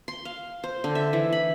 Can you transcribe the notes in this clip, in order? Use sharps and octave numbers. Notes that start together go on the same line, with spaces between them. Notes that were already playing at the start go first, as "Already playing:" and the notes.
C6
F5
C5
D3
E5
E3
B5